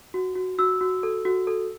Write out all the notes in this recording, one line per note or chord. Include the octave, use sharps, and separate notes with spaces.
F#4
F#4
F#4 E6
F#4
A4
F#4
A4